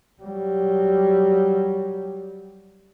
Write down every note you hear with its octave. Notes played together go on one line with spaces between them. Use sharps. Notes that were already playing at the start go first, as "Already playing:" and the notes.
F#3 G3